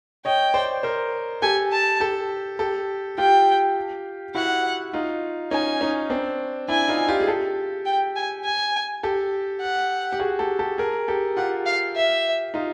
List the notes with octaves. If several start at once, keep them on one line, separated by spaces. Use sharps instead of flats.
C#5 D#5 G5
C5 D5
A#4 C5
G4 A4 G#5
A5
G4 A4
G4 A4
F4 G4 G5
E4 F#4 F#5
D#4 F4
C#4 D#4 G#5
C#4 D#4
C4 D4
D4 E4 G#5
D#4 F4
F4 G4
G#4
G4 A4
G5
G#5
G#5
G4 A4
F#5
G4
F#4 G#4
G4 A4
G4 A4
G#4 A#4
G4 A4
F4 G4 F#5
F5
E5
D#4 F4